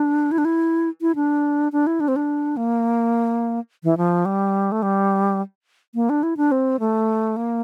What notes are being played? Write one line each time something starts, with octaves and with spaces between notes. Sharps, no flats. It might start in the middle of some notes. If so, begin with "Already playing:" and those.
Already playing: D4
E4
D4
E4
E4
D4
D4
E4
D4
C4
D4
A#3
E3
F3
G3
A3
G3
A#3
D4
E4
D4
C4
A3
A#3